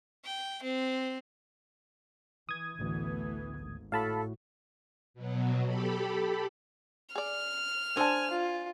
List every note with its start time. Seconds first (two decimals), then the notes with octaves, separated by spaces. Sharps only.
0.25 G5
0.62 C4
2.49 E3 D#6 G#6
2.79 A1 D2 E3 A3 B3
3.59 G#1
3.92 A2 F#4 A4 F5 A5 B5
5.14 B2 F#3
5.66 G4 A4 B5
7.15 G#4 D5 F6
7.97 D4 A4 C5 D5 G#5 A5
8.31 F4